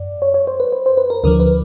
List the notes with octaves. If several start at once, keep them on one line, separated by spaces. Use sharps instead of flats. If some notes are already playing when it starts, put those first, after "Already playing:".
Already playing: F#2 D5
C#5
C#5
C5
B4
C5
C5
B4
A#4
D2 D3 F3 A#4
B4